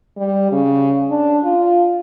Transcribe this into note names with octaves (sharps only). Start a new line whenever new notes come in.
G3
C#3
D4
F4